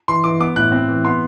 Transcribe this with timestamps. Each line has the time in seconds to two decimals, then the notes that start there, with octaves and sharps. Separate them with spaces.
0.08 E3 C6
0.24 E3 D6
0.40 B3 D6
0.56 A2 F#6
0.72 C4
0.88 E3
1.04 B3 C6